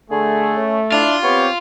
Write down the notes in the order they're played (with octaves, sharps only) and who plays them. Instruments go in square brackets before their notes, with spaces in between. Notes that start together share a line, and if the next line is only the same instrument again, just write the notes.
[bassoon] D3 [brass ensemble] A3 [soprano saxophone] G#4
[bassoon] C#4
[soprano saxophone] D4 [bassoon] E4 [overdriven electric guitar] F4
[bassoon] B3 [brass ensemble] C4 G4 [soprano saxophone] C#5